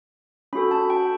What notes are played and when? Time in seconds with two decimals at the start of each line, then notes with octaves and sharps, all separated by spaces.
0.53 C#4 F#4 A4 B5
0.71 A5
0.90 G5